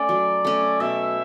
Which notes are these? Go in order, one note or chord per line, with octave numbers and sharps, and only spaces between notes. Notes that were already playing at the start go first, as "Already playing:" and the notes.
Already playing: A3 C#4 D5
F#3
A3 C#4
B2 E5